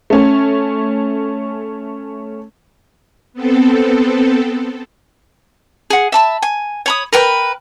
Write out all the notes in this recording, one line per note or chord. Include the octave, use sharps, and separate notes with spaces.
A3 C#4
B3 C4 A4
G#4 F#5
E5 A5 B5
G#5
C#5 B5 D#6
A#4 B4 G5 B5